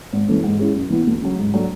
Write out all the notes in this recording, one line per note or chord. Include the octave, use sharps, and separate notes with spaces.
G#1
F#2 E3 A3 C#4
G#2
G#3 C#4 E4
F#2
E3 B3 E4
D2
C#3 F#3
G#2
F#3 A3 D4